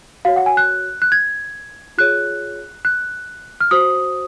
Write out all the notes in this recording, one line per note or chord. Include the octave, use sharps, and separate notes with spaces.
F#4 C#5 F5
F#5
G#5
F#6
F#6
G#6
F4 G#4 C#5 F#6
F#6
F6
F#4 C5 D#6